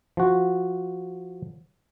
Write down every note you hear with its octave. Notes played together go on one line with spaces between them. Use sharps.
F3 F#4